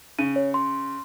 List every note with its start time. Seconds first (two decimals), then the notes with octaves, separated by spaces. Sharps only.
0.19 C#3 D#7
0.36 C#5
0.54 C6